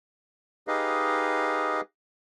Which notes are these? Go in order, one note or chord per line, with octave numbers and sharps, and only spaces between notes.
D#4 G4 G#4 B4 D#5 F5